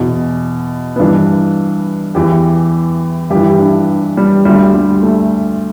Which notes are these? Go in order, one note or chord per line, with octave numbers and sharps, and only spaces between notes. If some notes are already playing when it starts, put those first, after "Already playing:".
Already playing: E2 B2
B3
G2 E3 D4
E2 E3 G4
G2 E3 E4 G4
G4
D4
G3
D2 D3 G3
G3
A3